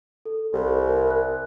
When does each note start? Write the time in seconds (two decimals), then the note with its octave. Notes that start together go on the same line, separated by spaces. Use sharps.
0.25 A4
0.53 C2
0.89 A#4
1.10 F#6